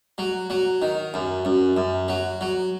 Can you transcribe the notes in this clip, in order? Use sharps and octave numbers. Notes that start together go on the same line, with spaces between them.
F#3
F#3
D#3
F#2
F#2
F#2
F#3
F#3